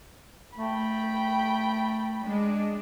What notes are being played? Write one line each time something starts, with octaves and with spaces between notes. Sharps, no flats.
A3 G5 B5
G#3 D4